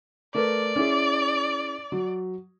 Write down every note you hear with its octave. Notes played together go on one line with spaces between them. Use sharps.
A3 A#4 B4 D5
C#4 E4 G#4
F#3